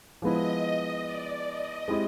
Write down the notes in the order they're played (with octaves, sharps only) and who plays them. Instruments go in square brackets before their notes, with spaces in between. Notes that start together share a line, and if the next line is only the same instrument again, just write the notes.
[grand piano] F3 G#3 B3 E4 [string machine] D#5
[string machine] D5
D#5
[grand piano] G#3 C4 E4 G4